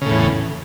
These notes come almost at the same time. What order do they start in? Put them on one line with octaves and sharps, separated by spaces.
C#3 A2 E2